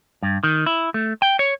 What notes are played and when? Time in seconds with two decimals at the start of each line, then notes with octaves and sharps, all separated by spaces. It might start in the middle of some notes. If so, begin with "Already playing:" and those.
0.23 G2
0.44 D#3
0.66 E4
0.94 A3
1.22 G5
1.39 C#5